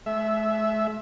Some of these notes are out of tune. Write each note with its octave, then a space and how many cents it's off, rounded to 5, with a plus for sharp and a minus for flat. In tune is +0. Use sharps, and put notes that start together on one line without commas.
A3 -45 E5 +0